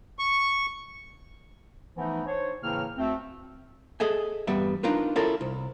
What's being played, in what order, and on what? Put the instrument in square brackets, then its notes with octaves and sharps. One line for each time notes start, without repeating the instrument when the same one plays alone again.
[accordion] C#6
[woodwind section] E3 F3 A3 B3 D#4
D4 C5 C#5
A2 C#3 E3 A#3 C4 F6
D2 A3 C4
[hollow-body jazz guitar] G#4 A4 D#5 E5 G#5
E2 G2 G3 B3 E5
D4 D#4 F4 A#4 B4
C#4 E4 F4 A4 A#4 D5
C2